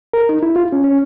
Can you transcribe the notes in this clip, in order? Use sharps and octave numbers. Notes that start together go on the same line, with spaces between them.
A#4
D#4
E4
F4
C#4
C#4